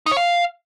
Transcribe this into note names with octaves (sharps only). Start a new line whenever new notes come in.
D#4
C#5
F5